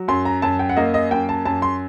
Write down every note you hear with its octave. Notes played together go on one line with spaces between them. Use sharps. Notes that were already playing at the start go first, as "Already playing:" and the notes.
Already playing: F#3
F#2 C6
A#5
F#2 A5
G5
F#5
A#3 D#5
D#5
F#2 G5
A5
F#2 A5
C6